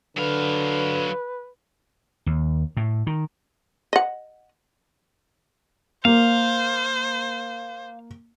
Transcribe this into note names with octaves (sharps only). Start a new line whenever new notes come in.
D3 F#3 B4 F5
D#2
A2
D#3
D#5 F#5
A#3 C5 F5